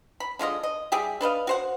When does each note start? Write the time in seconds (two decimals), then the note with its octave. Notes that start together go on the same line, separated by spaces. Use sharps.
0.20 B5
0.39 D3 G#3 F4 D#5
0.63 D#5
0.92 G3 G4 G#4 E5
1.21 D4 B4 D#5 F5
1.47 F#4 C5 F#5